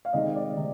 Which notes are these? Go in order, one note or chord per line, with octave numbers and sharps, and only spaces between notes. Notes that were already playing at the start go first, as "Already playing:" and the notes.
F5
C3 D#3 G#3 D#5
D5
C3